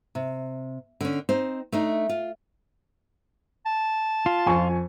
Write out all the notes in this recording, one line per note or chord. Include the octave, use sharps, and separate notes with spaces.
C3
D3 C#4
C4 D#4 C5
A3 D4 D#4
F4
A5
F4
F2 G#5 C#6